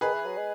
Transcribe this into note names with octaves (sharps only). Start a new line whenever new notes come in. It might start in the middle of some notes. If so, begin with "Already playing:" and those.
D#3 G#4 B4
E3
F#3
G#3